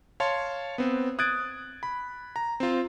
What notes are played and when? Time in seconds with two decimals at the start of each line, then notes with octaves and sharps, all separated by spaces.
0.20 C#5 F5 A5 C6
0.78 B3 C4
1.19 D#6 F#6 G#6 A6 D7
1.83 B5
2.36 A#5
2.60 C4 F4